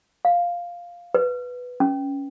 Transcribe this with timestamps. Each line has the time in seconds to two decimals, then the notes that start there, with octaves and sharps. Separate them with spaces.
0.25 F5
1.15 B4
1.80 C#4